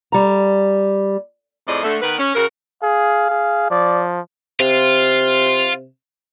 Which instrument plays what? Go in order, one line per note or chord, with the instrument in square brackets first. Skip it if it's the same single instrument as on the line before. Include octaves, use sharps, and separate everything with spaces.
[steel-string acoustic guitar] G3 A#5
[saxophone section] F2 A2 G#4 D5 D#5
D3 A3
D#3 B3 A#4 B4
C#4
C#3 F#4 A#4
[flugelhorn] G#4 [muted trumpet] F5
[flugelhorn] G#4
[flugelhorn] F3 [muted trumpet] D5
[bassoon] C3 [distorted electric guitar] F4